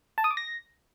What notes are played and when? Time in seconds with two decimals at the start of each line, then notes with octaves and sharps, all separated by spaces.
0.18 A5
0.24 D#6
0.31 D6
0.37 A#6